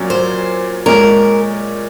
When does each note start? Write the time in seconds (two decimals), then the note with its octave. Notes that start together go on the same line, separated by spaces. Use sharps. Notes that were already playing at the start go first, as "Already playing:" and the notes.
Already playing: A#2 F#3 C#4
0.10 C5
0.86 A#2 G#3 C#4 A#4